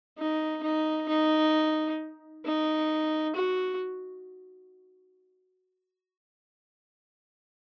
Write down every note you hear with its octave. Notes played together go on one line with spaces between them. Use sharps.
D#4
D#4
D#4
D#4
F#4